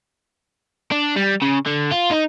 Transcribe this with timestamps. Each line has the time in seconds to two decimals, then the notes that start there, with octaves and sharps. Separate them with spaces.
0.91 D4
1.16 G3
1.42 C#3
1.66 D3
1.91 F4
2.11 D#4